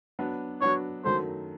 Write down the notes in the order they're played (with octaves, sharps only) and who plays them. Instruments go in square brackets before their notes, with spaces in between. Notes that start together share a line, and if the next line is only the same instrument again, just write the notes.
[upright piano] F#3 B3 D4
[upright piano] F#3 B3 D4 [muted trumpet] C#5
[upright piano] F#2 D#3 F#3 A3 [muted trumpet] C5